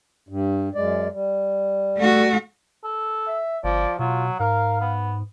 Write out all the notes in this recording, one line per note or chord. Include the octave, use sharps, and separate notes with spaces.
G2
F#2 G#3 D5
G3
A3 F#4
A4
E5
G1 F3 D5
B2 F#3 F4
G#2 A#4 F5
B3